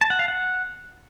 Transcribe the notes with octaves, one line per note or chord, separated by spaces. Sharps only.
A5
F#5
F5
F#5